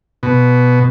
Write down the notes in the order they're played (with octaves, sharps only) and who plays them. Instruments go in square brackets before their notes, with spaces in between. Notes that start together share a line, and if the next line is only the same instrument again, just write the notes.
[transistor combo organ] B2